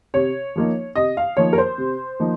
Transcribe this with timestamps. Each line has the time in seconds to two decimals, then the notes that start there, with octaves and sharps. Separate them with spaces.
0.14 C3 C#5
0.56 F3 A#3 D#4
0.96 C3 D#5
1.17 F5
1.37 F3 A#3 D#4 C#5
1.53 A#4
1.58 C5
1.78 C3
2.20 F3 A#3 D#4